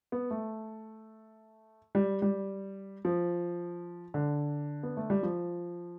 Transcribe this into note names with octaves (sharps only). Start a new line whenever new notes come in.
B3
A3
G3
G3
F3
D3
B3
A3
G3
F3